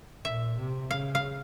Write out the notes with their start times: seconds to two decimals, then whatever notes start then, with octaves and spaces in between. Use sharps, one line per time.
0.25 A#2 E5
0.58 C3
0.91 C#3 F5
1.15 F5